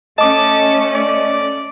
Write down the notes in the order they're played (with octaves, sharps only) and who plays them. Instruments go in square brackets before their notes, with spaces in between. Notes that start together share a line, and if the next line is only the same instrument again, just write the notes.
[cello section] A3 C#4 [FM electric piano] D#5 D6 [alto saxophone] A5
[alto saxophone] D5